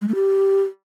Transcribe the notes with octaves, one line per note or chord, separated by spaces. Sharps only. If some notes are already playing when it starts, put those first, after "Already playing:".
G#3
A3
G4